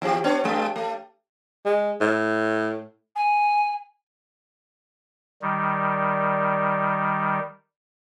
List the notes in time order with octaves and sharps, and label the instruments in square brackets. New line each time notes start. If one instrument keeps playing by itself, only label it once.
[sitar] D#2 F3 G4
B3 D4 C#5
G2 G#3
A3
[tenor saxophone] G#3
A2
[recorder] G#5
[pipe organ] D#3 G3